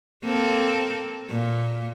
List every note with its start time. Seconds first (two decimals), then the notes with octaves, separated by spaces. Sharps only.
0.24 A#3 C4 A4
1.30 A#2